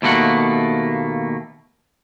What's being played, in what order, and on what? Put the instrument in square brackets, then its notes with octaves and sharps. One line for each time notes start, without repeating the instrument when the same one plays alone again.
[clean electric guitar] D#2 B2 A3 A#3 F#5